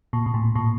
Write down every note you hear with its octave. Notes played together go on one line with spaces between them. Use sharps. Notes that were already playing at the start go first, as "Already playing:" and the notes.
A#2
A#2
A2
A#2